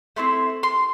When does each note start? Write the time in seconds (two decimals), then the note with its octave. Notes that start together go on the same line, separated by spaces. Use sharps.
0.16 A3 C4 E4 C6
0.63 C6